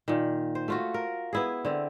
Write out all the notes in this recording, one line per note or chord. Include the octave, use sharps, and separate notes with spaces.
A#2 D#3
C5
A3 F4 F#4
A#4
B3 E4 G#4
D3 C4